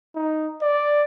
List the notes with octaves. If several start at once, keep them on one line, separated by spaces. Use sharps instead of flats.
D#4
D5